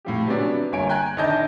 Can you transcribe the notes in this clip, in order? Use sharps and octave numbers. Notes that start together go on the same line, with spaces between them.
A2 F3 G4
C3 F#3 B3 C#4 D4
G1 A#3 C#5 G#5 D7
G5 G#5 A#5 F#6 G#6
A#1 D#3 D4 D#5 A5 G6